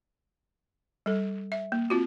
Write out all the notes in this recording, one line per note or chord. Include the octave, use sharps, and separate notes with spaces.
G3 A4
E5
A#3
C4 F4 F#4